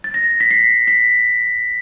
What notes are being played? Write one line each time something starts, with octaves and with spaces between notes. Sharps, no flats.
A6
A#6
B6
C7
B6